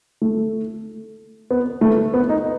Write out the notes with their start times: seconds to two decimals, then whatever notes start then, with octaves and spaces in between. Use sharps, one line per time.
0.22 A3
1.51 B3
1.81 A3
2.14 B3
2.29 D#4